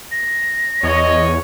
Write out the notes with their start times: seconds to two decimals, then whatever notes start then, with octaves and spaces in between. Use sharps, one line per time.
0.11 A#6
0.83 E2 C#5 D#5